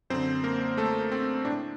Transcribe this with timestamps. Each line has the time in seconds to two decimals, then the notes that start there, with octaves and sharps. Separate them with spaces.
0.10 F#2 D3 C4 C5
0.44 A#3 A#4
0.77 A3 A4
1.12 C4
1.45 A2 D4